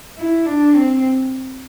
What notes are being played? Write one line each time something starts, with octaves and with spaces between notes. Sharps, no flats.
E4
D4
C4